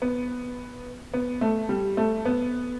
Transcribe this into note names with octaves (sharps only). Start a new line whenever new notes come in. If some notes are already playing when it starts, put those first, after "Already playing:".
B3
B3
A3
G3
A3
B3